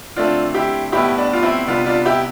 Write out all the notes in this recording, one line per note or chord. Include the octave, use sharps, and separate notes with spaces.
D3 A3 C4 D4 F4
E4 G4
A2 G3 B3 E4 G4
D4
F4
C4 E4
C3 G3 B3 D4 F4
D4 F4
E4 G4